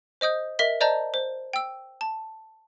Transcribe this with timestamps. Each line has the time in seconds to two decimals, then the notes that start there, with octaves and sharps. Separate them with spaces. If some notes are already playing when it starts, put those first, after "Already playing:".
0.21 C5 D#5 D#6 G6
0.59 A#4 D#5 E5 B6 G7
0.80 C5 D5 D#5 A5 A#5 G6
1.14 C5
1.53 G5 E6
2.01 A5